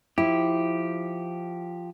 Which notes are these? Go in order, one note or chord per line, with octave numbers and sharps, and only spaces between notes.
F3 E4 G4